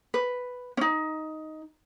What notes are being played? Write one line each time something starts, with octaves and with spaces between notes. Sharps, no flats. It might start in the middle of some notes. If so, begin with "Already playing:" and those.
B4
C#4 D#4